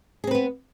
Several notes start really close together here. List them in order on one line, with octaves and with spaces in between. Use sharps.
G#4 C4 B4 B3